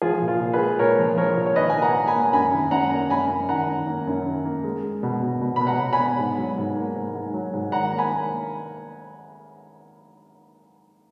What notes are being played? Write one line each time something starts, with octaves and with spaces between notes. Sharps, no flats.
F3 F4 G#4
A#2
F4
A#2
G#4 B4
G#3
A#2 A#4 C#5
F3
F3 A#4 C#5
A#2
C#5
D#3 B4 D#5
G#5
A#3
F#5 A#5
A#3
G#5 B5
A#3
F#2 G#5 B5
D#3
F#2 F#5 A#5
A#3
F#2 G#5 B5
F#2
D#3 F#5 A#5
D#3
A#3
F#2
D#3
A#3
G#3
G#3
B2
B2
B2
B2 B5
F#5 A#5
B2
G#5 B5
B3
G#2
F#3
G#2
A#3
G#2
G#2
F#3
G#2
D#3 F#5 A#5
A#3
G#5 B5
A#3